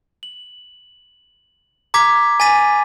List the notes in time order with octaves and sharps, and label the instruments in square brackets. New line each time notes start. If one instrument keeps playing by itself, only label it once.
[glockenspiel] F#7
A#5 D6 G#6 B6
G#5 A6 B6 D#7